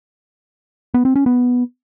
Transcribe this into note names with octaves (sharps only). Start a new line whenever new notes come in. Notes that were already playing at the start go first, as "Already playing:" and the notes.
B3
C4
C#4
B3